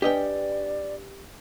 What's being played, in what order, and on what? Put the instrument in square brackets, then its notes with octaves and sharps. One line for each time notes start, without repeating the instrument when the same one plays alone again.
[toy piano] D4 B4 G#5 [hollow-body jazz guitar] G4 D#5 G5 [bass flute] D5